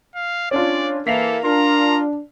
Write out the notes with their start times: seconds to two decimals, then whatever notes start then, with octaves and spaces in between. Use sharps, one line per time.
0.15 F5
0.51 C#4 D4 F4 D5
1.07 E3 A#3 A4 B6 C7 F7
1.44 D4 F4 A#4 A#5